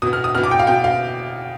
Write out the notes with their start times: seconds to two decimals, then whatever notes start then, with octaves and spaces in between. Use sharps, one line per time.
0.02 B2 B3 D#6
0.13 F6
0.24 D#6
0.35 B2 B3 F6
0.43 D6
0.51 G5
0.59 F5
0.67 B2 B3 G5
0.84 F5